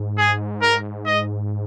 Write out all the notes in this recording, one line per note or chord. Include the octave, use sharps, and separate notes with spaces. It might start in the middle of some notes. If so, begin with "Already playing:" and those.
Already playing: G#2
G#4
A#4
D#5